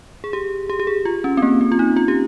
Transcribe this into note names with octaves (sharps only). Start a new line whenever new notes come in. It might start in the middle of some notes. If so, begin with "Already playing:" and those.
G#4
G4
G4
G4
G#4
F4
C#4
C4
A#3
C4
F4
D#4
F4
G4